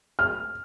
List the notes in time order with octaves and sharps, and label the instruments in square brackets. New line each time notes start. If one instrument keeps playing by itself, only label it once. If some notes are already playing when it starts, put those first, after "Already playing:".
[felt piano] F6